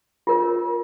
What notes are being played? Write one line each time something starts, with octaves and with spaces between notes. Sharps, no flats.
F4 A#4 C#5